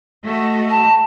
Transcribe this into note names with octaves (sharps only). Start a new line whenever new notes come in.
A3 F#4 D#5
A5